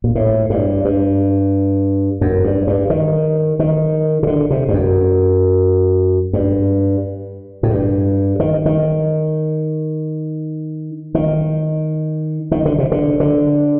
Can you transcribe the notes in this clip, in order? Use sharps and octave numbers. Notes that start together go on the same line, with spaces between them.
A#2
A2
G2
G2
F#2
G2
G2
D#3
D#3
C3
D3
C3
G2
F#2
G2
A2
G2
D#3
D#3
D#3
D#3
D3
C3
D3
D3